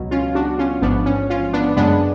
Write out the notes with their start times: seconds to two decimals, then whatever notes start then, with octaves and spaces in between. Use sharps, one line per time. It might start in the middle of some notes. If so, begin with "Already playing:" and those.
Already playing: C#2 B2 F#3
0.11 C#4 F4
0.35 D4 F#4
0.58 C#4 F4
0.82 A1 G#2 F3 B3 D4
1.06 C#4
1.30 C#4 F4
1.53 B3 D4
1.77 F#2 C#3 G#3 B3 D4